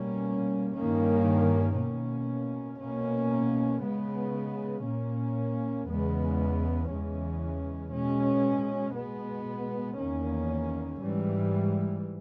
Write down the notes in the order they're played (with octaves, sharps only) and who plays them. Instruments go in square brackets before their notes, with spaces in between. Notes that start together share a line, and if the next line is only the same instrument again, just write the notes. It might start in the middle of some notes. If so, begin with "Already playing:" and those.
Already playing: [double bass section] B2 G3 A#3 C#4
G2 D#3 A#3 C#4
B2 A#3 C#4
B2 A#3 C#4
C#3 G#3 B3
A#2 A#3 C#4
E2 C#3 G#3 B3
E2 C#3 E3 G#3 C#4
B2 G#3 C#4
B2 G#3 B3
E2 D#3 A#3 C#4
G#2 E3 G3